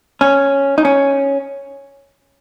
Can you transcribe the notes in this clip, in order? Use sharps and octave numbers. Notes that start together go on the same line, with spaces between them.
C#4
D#4
C#4